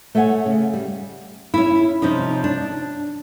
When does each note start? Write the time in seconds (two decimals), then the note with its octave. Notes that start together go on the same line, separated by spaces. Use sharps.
0.15 A3 A4 C#5 F#5 G#5
0.46 C#3
0.74 G3
1.54 C#4 E4
2.02 C3 F3 C#4 D#4
2.44 D4